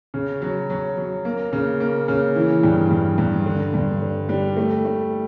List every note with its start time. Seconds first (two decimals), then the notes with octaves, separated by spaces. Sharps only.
0.14 C#3
0.42 F#3
0.70 F#3
0.98 F#3
1.25 A#3
1.53 C#3
1.80 A#3
2.08 C#3
2.36 E3
2.63 G2
2.91 G2
3.18 G2
3.46 D3
3.74 G2
4.02 D3
4.29 G3
4.57 A3
4.85 A3